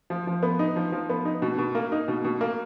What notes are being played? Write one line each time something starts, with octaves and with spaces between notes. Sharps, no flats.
F3
F3
B3
D#4
F3
F3
B3
D#4
B2
B2
A#3
D#4
B2
B2
A#3